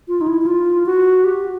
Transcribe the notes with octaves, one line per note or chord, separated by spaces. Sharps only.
F4
D#4
E4
E4
F4
F#4
G4